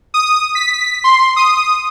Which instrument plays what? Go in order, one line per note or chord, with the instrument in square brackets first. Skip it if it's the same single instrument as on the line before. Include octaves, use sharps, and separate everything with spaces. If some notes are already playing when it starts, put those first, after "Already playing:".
[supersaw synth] D#6
B6
C6
D#6